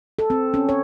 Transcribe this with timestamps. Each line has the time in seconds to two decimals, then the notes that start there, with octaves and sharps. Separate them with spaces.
0.19 A4
0.30 C4
0.54 C#4
0.69 C#5